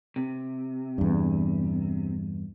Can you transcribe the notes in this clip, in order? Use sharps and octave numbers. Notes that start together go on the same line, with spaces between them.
C3
E2 G2